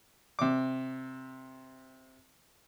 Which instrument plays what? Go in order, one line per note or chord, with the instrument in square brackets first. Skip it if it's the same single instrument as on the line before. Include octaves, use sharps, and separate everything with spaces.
[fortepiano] C3 D6